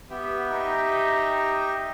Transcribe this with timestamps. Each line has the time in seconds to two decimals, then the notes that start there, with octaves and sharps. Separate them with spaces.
0.10 B3 G4 E5 G5
0.50 D#4